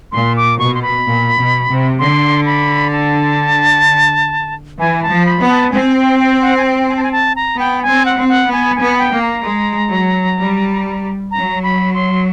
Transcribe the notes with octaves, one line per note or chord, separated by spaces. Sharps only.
A#2 C6
D6
B2 C#6
C6
B5
A#2
B2
C3
D3 C6
B5
A5
E3 G#5
A5
F3
B5
B3
A5
C4 G#5
G5
G5
F#5
G#5
G5
G#5
A5
G#5
A5
A#5
B3 G5
G#5
C4
F#5
C4
F#5
B3 G#5
G#5
B3
G5
A#3
A#5
G#3
F#3
G3
F#3 A#5
B5
C6